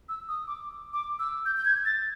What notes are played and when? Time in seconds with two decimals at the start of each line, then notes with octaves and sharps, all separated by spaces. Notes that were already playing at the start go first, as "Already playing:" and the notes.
0.09 E6
0.28 D#6
0.47 D6
0.93 D6
1.19 E6
1.46 G6
1.57 G6
1.65 G#6
1.85 A6